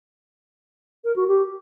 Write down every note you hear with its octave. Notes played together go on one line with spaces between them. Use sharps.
A#4
F#4
G4